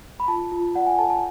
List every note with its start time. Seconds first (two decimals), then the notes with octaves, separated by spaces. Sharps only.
0.20 B5
0.28 F4 A5
0.52 F4
0.75 D5 F#5
0.87 G#5
0.98 A4 A5
1.10 A5